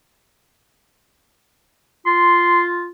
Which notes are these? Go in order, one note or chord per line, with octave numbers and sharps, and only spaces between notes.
F4 C6